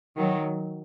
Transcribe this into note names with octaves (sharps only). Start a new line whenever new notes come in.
D#3 F#3